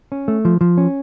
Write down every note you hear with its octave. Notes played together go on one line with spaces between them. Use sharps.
C#4
A3
F3
F3
C#4